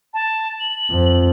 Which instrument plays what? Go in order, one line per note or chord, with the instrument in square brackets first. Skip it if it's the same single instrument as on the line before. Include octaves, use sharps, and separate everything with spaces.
[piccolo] A5
F#7
[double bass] F2